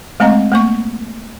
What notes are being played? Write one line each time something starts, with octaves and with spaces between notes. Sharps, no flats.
G#3 A3 C4 D#5 A#5
A3 A#3 C#6